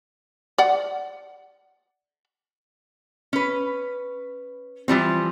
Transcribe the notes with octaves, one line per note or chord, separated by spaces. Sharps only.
D5 F#5
C#4 B4
E3 F3 G3 C4